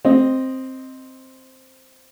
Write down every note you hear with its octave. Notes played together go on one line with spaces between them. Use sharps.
C4 D#5